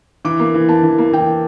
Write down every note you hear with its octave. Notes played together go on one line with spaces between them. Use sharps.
E3 D6
A#3
E3
A#3 A5
E3
A#3
E3 G5